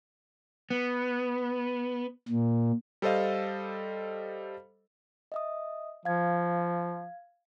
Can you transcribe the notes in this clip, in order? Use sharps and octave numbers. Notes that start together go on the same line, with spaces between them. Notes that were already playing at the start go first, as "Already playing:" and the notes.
B3
A#2
G3 A4 C5 D#5 F5
D#5 E5 D#6
F3 F5 G#6